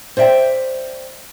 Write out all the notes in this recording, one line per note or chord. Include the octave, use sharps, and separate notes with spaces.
C5 D5 E5 G5